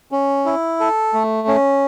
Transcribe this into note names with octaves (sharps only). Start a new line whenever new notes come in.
C#4
E4
A4
A3
C#4